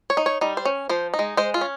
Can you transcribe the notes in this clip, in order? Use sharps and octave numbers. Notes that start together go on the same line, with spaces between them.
C#5
D#4
C#5
G3 D#4
C5
C#4
F3 C5
D#4
G#3
G#3 C5
F4
C#4